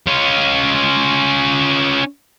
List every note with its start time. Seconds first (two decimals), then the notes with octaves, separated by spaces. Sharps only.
0.07 C#4 F4